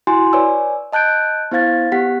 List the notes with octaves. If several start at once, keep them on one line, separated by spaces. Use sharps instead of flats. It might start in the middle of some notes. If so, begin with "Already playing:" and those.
E4 F#4 G#5 C6
B4 C#5 D5 G#5 E6
D#5 A5 F#6 G6 D7
B3 E4 C5 F5 G#6 A6
B3 G4 F#5 B6